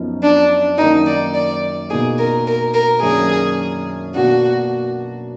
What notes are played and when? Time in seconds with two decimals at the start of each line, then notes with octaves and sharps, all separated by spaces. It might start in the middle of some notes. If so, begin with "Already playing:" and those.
Already playing: F#2 F3 B3 D#4
0.22 D4
0.78 F#2 D#3 A#3 D#4
1.06 D5
1.34 D5
1.89 B2 A#3 D#4 G#4
2.18 A#4
2.47 A#4
2.74 A#4
3.02 F#2 D#3 A#3 D4 G#4
4.14 B2 A#3 D4 F#4